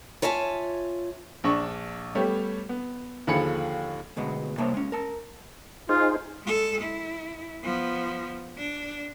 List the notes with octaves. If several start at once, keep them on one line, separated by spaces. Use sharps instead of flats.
F4 C#5 E5 G#5 A5
A#1 D4 C#6
G3 A3 B3 G4 C#5
B3
D#2 D3 F3 G#4 B5 C#7
D2 B2 G#3 B3
C3 G3 A#3 C5 C#5 A5
G#3 C#4
A#4 A5
D#4 F4 G#4 C5
G#3 A4
E4
F3 B3
D4